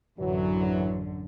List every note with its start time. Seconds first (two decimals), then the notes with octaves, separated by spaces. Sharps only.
0.18 A1 F#2 D3 E3 F#3